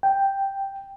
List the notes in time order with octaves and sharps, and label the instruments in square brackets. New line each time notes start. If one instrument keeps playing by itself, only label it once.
[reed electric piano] G5